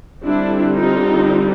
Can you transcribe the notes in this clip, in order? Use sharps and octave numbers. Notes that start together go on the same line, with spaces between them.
D3 G3 C4 D4 E4
D#4 F4